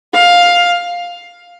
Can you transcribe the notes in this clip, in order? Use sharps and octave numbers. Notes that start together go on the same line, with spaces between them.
F5